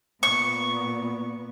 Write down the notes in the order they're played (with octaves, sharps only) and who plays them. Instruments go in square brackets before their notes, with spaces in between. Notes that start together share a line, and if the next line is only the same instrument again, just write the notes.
[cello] A#2 B3 [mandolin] C#6